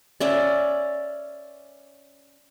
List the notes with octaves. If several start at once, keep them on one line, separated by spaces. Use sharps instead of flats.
C#4 D5 E5